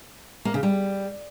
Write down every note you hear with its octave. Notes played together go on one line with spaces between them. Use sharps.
A#3
C#3
G3